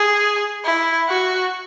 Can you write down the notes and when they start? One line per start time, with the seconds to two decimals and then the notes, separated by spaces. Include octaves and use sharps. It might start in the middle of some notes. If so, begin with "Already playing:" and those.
Already playing: G#4
0.65 E4
1.09 F#4